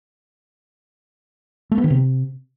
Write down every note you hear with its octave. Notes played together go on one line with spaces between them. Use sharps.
A3
B3
D#3
C3